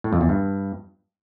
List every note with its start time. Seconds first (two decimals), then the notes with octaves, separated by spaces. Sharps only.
0.04 A2
0.13 F2
0.21 E2
0.29 G2